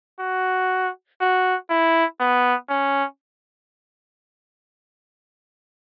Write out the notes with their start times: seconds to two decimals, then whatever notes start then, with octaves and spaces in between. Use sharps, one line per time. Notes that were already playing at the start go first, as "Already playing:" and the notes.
0.19 F#4
1.20 F#4
1.70 E4
2.20 B3
2.69 C#4